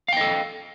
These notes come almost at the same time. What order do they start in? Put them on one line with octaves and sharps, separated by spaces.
F5 G5 D#5 A4